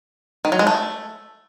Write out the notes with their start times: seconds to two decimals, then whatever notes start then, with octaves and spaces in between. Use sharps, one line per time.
0.45 D#3
0.52 F#3
0.59 G#3
0.67 A3